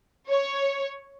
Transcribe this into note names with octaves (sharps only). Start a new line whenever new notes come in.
C#5